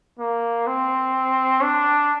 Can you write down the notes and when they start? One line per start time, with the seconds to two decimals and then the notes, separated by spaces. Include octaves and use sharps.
0.19 A#3
0.67 C4
1.62 D4